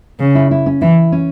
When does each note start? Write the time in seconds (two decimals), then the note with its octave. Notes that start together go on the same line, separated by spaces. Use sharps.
0.20 C#3
0.35 E4
0.51 E4
0.66 C#4
0.82 E3 E4
1.12 C#4